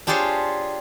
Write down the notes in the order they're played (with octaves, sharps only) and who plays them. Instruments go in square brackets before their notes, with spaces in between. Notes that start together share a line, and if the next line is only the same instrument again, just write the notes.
[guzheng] D4 F4 G4 G#4 C5 C#5